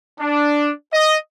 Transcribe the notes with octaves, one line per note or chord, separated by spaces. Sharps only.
D4
D#5